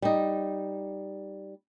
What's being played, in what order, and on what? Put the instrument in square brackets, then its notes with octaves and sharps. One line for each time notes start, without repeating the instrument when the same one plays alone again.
[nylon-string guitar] G3 D#4